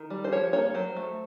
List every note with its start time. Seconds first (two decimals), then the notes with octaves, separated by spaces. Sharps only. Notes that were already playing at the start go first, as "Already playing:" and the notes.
Already playing: D#3
0.10 G3
0.24 C5
0.32 F3 C#5
0.53 A#3 C#5
0.74 F#3 C5
0.97 A3